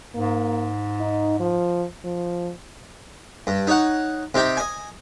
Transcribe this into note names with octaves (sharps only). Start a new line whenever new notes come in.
G#2 A#3
D#4
F3
F3
G2
D#4 C#5 F#5
C3 D#4 G4 G5
D#5 G#5